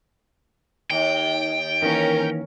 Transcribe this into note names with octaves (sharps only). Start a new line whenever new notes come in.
D#2 G5
D#3 E3 A#3 C#4 A#4